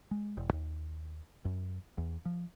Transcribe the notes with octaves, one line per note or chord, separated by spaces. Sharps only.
G#3
E1
D#2
F#2
E2
F3